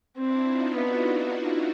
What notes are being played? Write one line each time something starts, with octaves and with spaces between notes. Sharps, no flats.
C4 D4 E4
D#4 F4
B3 E4 F#4